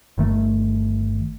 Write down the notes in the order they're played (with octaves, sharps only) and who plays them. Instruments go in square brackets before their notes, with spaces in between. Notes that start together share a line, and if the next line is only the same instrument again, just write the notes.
[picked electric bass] G1 D#3 A3